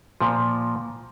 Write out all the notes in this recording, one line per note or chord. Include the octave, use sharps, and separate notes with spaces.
A#2 F3